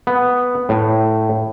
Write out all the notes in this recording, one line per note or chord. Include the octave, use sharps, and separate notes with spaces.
B3
A2